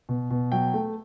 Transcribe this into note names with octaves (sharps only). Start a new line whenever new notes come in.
B2
B2
F#3 G5
A3